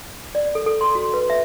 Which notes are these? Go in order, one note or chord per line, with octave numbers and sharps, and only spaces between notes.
D5
A4
A4
C6
F#4
B4
E5